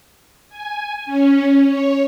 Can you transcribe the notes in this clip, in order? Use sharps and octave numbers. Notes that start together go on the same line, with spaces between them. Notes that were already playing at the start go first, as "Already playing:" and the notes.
G#5
C#4
C#5